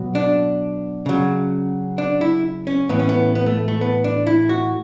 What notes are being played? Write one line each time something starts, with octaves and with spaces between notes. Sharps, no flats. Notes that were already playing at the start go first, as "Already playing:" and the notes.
Already playing: B2 F#3
D4
C#3 F#3
D4
E4
C#4
A2 E3 B3
C#4
B3
B3
A3
A3
B3
D4
E4
F#4